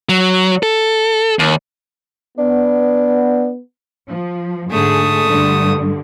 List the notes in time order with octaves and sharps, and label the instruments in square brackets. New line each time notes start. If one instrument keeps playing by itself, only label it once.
[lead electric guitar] F#3
A4
D#2
[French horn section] B3 [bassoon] D4
[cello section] F3
[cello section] G#2 D3 G#4 [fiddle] A3 D#6
[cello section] G2 D3